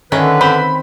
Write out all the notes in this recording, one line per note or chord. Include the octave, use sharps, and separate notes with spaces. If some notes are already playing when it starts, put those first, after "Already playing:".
D3 D#3 C#4 E4 B4
C4 B5